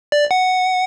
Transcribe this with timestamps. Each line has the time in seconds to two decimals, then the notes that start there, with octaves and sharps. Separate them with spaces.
0.12 D5
0.31 F#5